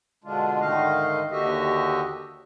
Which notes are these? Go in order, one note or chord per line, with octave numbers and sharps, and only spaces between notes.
B2 D3 G#3 D4 F4
G#2 D3 D#3 A3 D#5 F5
D#2 D3 F#4 G4 D#5 E5